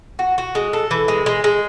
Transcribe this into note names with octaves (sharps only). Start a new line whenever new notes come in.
F#4
F#4
G#3
A4
E3
G#3
G#3
G#3